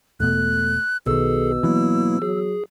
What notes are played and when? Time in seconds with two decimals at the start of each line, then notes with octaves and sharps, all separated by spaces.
0.20 E1 B2 A3 F#6
1.07 B1 B2 D#3 G#4 A4 E6
1.63 E3 F#3 A#3 B3 E4
2.22 F#3 G#4